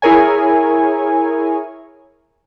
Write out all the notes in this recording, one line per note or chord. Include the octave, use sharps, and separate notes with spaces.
E4 G#4 A#4 C#5 G#5